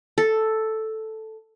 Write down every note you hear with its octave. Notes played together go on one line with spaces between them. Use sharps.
A4